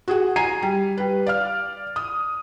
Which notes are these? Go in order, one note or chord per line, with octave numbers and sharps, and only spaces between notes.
F#4 G#4 F#5
G#5 A#5 G#6 C7 D#7
G3
G3 B4
D5 F5 F6
D#6